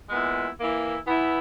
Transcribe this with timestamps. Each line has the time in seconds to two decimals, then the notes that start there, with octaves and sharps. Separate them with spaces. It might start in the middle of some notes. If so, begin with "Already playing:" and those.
0.09 A#2 G#3 B3 E4
0.58 E3 A#3 E4
1.06 E3 B3 E4